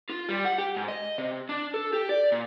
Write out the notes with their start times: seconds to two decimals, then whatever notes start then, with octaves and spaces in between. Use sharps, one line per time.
0.09 F4
0.29 G3
0.45 F#5
0.58 G4
0.77 G#2
0.88 D#5
1.18 C3
1.49 D4
1.74 A4
1.93 G4
2.09 D5
2.32 A#2